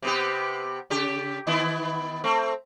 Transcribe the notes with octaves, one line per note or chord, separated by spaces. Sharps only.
C3 B3 G4
C#3 G4
D#3 B3 E4
A3 C4